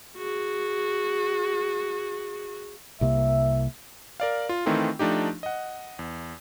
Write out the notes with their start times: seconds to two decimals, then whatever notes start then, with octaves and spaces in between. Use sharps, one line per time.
0.16 F#4 G#4
3.01 C2 C3 A#3 E5
4.20 A#4 D5 F5
4.49 F4
4.66 D#3 E3 A3 C4 D#4 F4
4.99 F3 A3 D4 D#4 G4
5.43 D#5 F#5
5.99 E2